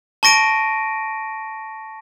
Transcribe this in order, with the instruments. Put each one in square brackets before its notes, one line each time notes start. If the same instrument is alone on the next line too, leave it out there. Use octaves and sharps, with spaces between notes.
[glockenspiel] A5 C#6 A#6 D7 D#7